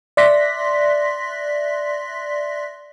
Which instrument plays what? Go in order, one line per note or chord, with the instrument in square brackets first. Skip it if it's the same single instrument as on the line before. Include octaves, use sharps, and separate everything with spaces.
[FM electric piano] D5 E5 C6 F#6 A#6 B6